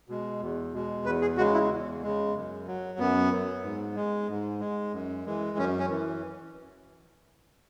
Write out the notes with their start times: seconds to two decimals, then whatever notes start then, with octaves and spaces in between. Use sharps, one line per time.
0.09 B2 G#3
0.41 E2
0.73 B2 G#3
1.05 E2 B4
1.21 G#4
1.37 C#3 G#3 F#4
1.54 E4
1.70 E2
2.02 C#3 G#3
2.35 F#2
2.67 F#3
2.99 F#2 B3
3.32 F#3
3.63 G#2
3.95 G#3
4.29 G#2
4.60 G#3
4.93 F#2
5.26 E3 G#3
5.58 F#2 C#4
5.79 C#4
5.90 E3